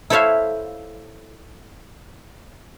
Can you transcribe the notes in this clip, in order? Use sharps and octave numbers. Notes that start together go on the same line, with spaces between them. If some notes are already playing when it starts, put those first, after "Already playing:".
E4 A4 C5 C#5 E5 F5